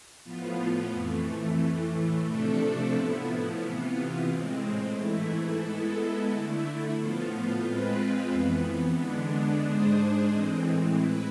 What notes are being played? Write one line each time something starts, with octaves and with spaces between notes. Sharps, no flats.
A2 F3 B3 F4
F2 E3 A3
A2 E3 A3
C3 F3 A3 D4 A4
A2 F3 B3 E4
C3 E3 B3 F4
A2 G#3 C4
G#2 E3 A3 E4
G#3 B3 E4 A4
D3 A3 E4
A2 F3 B3 F4
G#3 C4 F4 B4
F2 E3 B3
D3 G#3 B3 D4
G#2 G#3 D4 G#4 C5
A2 E3 G#3 C4
E4 B4